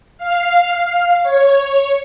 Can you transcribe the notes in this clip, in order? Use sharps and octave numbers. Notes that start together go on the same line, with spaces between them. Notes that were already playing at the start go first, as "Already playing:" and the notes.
F5
C#5